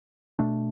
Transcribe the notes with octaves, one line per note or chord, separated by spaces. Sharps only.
B2 A3 D4